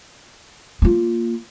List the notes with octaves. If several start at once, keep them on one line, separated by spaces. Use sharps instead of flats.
A#3 F4